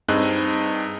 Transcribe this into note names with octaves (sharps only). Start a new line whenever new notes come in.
G2 C4 D#4 G#4 D#5 F#6